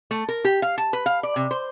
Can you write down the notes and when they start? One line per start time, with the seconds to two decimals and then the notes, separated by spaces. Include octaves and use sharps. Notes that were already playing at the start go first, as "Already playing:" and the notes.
0.11 A3
0.29 A#4
0.45 G4
0.62 F5
0.78 A5
0.93 B4
1.06 F5
1.23 D5
1.36 C3
1.51 C5